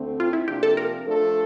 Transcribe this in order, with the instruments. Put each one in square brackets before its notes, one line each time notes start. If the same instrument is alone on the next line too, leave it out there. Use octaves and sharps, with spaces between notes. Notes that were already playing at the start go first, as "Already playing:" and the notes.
Already playing: [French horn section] D2 D3 A3 C4
[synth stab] F4
E4
[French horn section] C3 F3 A#3 D4 [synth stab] G4
[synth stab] A4
A#4
[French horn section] F3 A3 D4 A4